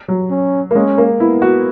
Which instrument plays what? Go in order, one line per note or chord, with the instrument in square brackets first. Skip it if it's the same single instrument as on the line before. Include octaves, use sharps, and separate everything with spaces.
[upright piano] F#3
[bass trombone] C#4
[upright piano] A#3
[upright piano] G#3 [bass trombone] C#4
[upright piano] A#3
[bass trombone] B3 [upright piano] E4
[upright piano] F#4